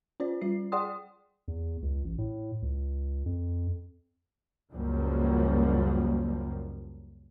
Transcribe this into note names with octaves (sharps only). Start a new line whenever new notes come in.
C#4 F4 C5 D5
G3 F4 C7
G#4 D5 F#5 G5 C6 D#6
E2
C#2
A1
A2
C#2
F2
C#2 F#2 F3 G3 A#3